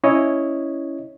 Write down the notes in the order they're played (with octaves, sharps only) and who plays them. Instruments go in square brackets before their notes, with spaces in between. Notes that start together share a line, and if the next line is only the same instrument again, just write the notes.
[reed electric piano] C#4 E4 C#5 D#5